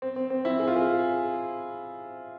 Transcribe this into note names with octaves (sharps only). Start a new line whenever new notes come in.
C4
C4
C4
E4
G#4
F4
G#4